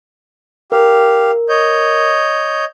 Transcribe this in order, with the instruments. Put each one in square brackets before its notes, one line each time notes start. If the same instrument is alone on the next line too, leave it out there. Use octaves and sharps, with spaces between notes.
[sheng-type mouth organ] G4 F5 [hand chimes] A#4
[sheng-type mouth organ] C#5 D#5 G6